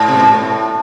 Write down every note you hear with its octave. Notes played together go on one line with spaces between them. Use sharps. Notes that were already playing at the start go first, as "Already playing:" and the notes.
Already playing: G#2
C3
B2
A#2
A2